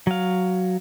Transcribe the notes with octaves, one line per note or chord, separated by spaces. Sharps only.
F#3 F5